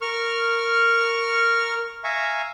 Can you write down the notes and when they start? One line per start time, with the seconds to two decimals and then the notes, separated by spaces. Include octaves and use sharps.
0.02 A#4 C#6 F6
2.04 E5 F5 G#5 A#5 C#6